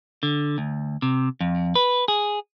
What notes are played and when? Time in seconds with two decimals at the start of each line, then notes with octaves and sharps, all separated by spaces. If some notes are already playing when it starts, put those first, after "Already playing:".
0.23 D3
0.58 D2
1.02 C3
1.41 F2
1.75 B4
2.08 G#4